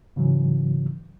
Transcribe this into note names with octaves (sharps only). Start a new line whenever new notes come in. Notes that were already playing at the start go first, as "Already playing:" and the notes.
G#2 C#3 E3 F#3